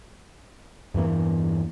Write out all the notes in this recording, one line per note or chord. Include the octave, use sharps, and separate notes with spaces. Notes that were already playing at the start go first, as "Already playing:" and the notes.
E2 G2 E3 A#3